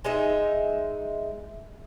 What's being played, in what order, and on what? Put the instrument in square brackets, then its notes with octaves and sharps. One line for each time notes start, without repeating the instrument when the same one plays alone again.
[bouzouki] G#3 D#4 E5